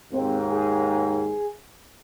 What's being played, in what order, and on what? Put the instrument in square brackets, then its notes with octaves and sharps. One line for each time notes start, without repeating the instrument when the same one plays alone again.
[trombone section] D#2 G#2 [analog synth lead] C4
[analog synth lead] G#4